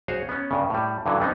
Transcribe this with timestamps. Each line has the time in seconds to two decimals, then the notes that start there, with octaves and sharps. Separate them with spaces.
0.08 F#4 G#4 C5 C#5 F5
0.29 B3 C#4
0.51 G2 C#3
0.70 A2 G3
1.06 G2 D3 E3 F#3
1.20 G3 B3 C4 D#4